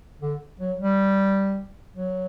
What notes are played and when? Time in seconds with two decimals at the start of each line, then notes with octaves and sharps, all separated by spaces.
0.21 D3
0.59 F#3
0.79 G3
1.96 F#3